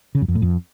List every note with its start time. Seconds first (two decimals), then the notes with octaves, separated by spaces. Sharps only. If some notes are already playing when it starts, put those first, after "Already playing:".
0.15 C#3
0.22 F#2
0.28 F2
0.35 A2
0.42 F2